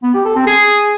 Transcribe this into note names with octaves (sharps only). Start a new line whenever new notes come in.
B3
G4
A4
C4
G#4